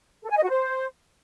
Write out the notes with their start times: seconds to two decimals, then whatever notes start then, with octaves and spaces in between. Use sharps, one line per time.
0.23 A4
0.30 G#5
0.36 D#5
0.43 F#4
0.50 C5